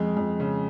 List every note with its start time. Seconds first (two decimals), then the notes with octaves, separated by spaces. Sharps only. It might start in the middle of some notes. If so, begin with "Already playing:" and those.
Already playing: F2 G#3
0.17 F2
0.40 C#3